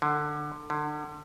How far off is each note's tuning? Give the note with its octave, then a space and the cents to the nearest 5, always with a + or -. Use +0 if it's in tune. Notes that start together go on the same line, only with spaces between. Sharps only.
D3 +20
D3 +35